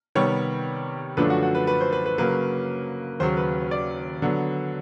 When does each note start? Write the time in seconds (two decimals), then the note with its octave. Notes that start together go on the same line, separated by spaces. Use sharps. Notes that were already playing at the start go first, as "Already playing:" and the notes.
0.15 C3 D#3 G3 B3 C#5
1.17 F#2 D3 F3 A3 D4 B4
1.30 F#4
1.43 F#4
1.55 B4
1.67 B4
1.81 C5
1.93 B4
2.06 B4
2.18 C#3 F#3 A#3 B4
3.20 D#2 C#3 F#3 C5
3.37 B4
3.71 D5
4.22 D3 F#3 B3